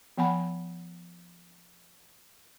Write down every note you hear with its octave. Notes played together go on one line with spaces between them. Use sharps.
F3 B3 F#5 G#5 B5